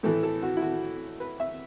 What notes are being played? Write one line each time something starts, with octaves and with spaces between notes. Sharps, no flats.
A2 E3 A3 A4
A4
F#4
E4
F#4
B4
E5